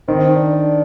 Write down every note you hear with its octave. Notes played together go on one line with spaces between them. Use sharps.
D#3 C4
D4